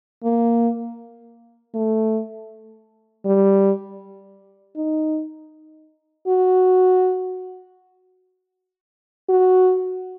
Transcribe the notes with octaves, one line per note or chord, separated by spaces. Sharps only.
A#3
A3
G3
D#4
F#4
F#4